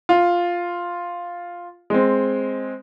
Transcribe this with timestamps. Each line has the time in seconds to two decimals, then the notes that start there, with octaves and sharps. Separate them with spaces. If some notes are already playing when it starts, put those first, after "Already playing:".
0.09 F4
1.90 G#3 C4